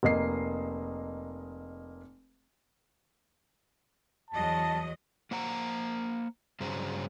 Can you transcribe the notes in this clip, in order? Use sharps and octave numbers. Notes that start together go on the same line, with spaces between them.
F1 A#3 D#5 C7
E2 F#3 D#5 A5
A#3 C5 F#5 A#5
G2 C#3 F#3 G#4 C5 A#5